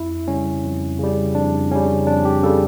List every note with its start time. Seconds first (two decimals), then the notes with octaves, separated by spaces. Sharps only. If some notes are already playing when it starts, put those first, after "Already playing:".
Already playing: F2 E4
0.28 C#3 G3 C#4
0.64 F2
0.99 C#3 G3
1.35 F2 D4
1.71 C#3 G3 C#4
2.07 F2 D4
2.25 G4
2.43 C#3 G3 A4